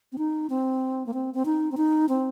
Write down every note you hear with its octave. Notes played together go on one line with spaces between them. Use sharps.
C4
D#4
C4
A#3
C4
C4
D#4
C4
D#4
C4